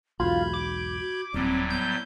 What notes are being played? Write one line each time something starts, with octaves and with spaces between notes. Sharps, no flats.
B1 E2 G#2 F4 F#4 B5 G6 G#6
D6
F#4
D#1 A2 F#3 G3 C4
B3 G6